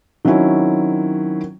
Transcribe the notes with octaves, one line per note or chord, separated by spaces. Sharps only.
D#3 F#3 C4 C#4 E4